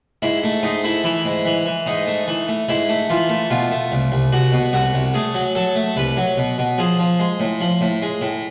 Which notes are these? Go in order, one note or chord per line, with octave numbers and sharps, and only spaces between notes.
G#2 E4
A3
G#2 D#4
A3 E4
E3 E4
G#2
E3
E3
G#2 D#4
A3
E3
A3
G#2 E4
A3
E3 F4
A3
B2 F4
A3
C2
C2
C2 F#4
B2
C2 F#4
C2
A3 G#4
F#3
F#3 A4
A3
C2 B4
F#3
B2
B2
F3 G#4
F3
G#3
A2
F3
A2
G#3
A2